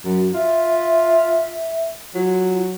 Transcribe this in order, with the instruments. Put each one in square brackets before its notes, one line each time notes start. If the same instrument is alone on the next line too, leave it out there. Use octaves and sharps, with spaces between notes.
[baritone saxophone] F#2 [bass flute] F#3
[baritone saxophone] F4 [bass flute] E5
[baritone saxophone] F#3 [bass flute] F4